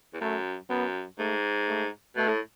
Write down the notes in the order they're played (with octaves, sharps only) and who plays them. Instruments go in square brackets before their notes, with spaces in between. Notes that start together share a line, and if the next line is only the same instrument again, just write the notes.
[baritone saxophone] E2
[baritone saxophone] F#2 [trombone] A3
[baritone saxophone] F#2 [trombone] B3
[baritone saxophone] G#2 [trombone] A3
[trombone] A3
[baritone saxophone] B2 [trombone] A3
[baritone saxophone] A2